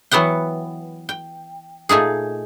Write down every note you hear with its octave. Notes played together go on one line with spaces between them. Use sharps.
E3 F#3 B3 F#5 G5
G5
A#2 A3 D#4 G#4